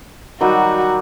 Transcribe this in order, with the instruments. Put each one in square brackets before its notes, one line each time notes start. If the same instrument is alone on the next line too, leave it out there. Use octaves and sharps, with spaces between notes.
[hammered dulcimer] D#3 F#3 G3 [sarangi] F#4